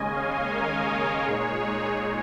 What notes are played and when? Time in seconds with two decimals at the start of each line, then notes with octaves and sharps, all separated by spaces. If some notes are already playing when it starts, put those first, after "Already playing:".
Already playing: D#2 C#3 G#3 C#4 D#5 G#5
0.12 C#5 F5
0.49 A#4 D#5
0.87 G#4 C#5
1.24 A#2 G#3 D#4